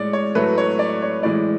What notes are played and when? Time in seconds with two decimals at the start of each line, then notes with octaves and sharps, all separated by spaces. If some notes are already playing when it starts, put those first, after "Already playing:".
Already playing: A2 G#3 C#5 D5
0.13 C#5
0.35 A2 F#3 A3 B4
0.58 C#5
0.79 D5
1.02 C#5
1.23 A2 E3 G#3 D5